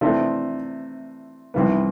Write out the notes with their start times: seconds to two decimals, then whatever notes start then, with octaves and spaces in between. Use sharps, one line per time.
0.01 C3 E3 A3 D4 A4
1.54 C2 C3 E3 B3